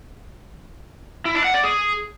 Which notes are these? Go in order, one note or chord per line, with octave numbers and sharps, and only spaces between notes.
E4
D4
F#5
D5
G#4